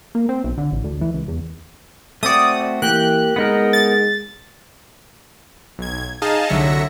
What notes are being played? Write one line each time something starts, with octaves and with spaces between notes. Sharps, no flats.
A#3
C4
B1
D3
A1
D2
E3
C#2
E2
A3 C4 F#4 D5 D#6
E3 A#3 G4 G5 F#6
G#3 B3 D#4 A#4
A6
B1 G#6
D#4 G#4 D#5 F5 A5
C2 D3 F#3 E5 A#6 C#7